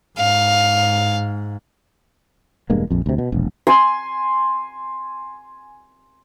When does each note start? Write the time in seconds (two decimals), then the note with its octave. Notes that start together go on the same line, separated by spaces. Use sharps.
0.18 G#2 F5
2.70 E1 G2 G#3 A#3
2.91 A#1 F2
3.06 D2 C3
3.18 B2
3.32 E1 A#1
3.67 G#5 C6